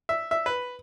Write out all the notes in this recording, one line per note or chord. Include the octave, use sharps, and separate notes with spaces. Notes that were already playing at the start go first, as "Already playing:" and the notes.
E5
E5
B4